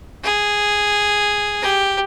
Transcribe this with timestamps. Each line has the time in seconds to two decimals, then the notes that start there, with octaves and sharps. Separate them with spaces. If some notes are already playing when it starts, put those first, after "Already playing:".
0.24 G#4
1.62 G4